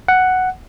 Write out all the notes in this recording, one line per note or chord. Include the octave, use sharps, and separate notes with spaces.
F#5